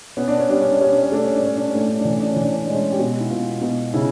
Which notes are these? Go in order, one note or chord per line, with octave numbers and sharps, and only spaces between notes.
B3 C#4
D4
C#4
G3 D4
C#4
D4
G3 C#4
D4
C#4
A3 D4
C#4
D4
A2 C#4
D4
C#4
A2 D4
C#4
D4
E3 C#4
D4
C#4
E3
D4
C#4
G#3 D4
C#4
G4
B2 F#4
E4
B2 F4
B2
C#3 E4